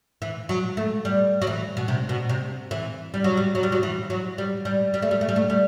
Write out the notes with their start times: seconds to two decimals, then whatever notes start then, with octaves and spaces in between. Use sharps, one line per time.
0.22 E3
0.49 F#3
0.77 A3
1.05 G3
1.42 F#3
1.47 E3
1.77 B2
1.88 C3
2.09 B2
2.29 C3
2.71 E3
3.14 G3
3.24 F#3
3.37 G3
3.55 F#3
3.63 G3
3.72 F#3
3.83 E3
4.10 F#3
4.38 G3
4.65 G3
4.94 G3
5.02 A3
5.11 G3
5.21 A3
5.29 G3
5.36 A3
5.50 G3